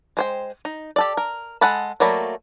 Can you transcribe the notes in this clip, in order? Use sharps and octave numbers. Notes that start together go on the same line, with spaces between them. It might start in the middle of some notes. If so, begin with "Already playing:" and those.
G#3 C5 G5
D#4
G4 A4 D5
A#4
G#3 A4 F#5 A5 B5
F#3 A3 A#3 D5 B5